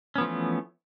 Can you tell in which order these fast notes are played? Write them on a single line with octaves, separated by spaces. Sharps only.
C#4 B3 F3 A3 E3